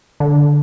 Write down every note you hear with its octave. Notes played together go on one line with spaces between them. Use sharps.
D3